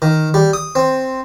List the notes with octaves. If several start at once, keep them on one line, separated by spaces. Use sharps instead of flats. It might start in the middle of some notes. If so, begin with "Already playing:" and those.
D#3
G3
D#6
C4